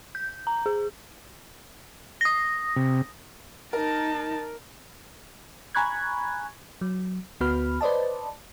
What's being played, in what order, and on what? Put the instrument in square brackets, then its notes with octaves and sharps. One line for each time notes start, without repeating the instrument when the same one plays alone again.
[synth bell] G6
A#5
G#4
D#6 A#6
[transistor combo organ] C3
[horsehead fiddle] D#4 A5 [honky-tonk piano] A#4
[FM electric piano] G#5 A#5 B5 C#6 F#6 G#6
F#3
D2 B3 F#4 B4 B5 F6
B4 C5 D5 D#5 A5